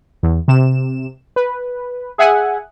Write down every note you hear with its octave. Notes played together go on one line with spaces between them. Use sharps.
E2
C3 E7
B4
G#4 E5 F#5 G#5